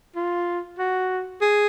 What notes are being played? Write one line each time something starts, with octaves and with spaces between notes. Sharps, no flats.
F4
F#4
G#4